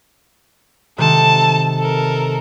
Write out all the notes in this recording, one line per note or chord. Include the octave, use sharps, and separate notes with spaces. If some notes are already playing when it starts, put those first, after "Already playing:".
C3 D#3 G#3 A4 A5
A4 A#4